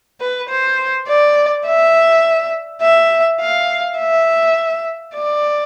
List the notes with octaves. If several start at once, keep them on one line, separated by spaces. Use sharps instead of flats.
B4
C5
D5
E5
E5
F5
E5
D5